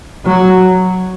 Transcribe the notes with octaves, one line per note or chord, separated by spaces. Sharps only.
F#3